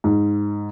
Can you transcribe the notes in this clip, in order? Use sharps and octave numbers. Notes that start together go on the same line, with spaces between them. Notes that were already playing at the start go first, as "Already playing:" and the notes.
G#2